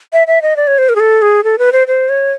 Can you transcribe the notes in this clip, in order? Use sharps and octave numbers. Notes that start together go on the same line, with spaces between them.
E5
E5
D#5
D5
C#5
C5
A#4
G#4
A4
G#4
A4
B4
C5
C5
C#5